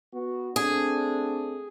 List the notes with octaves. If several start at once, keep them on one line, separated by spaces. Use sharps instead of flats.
B3 F#4
A3 C4 D4 G#4